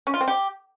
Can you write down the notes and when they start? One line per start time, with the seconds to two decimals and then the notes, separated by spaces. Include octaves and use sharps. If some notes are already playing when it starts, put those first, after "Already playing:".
0.07 C#4
0.14 F4
0.21 C4
0.28 G4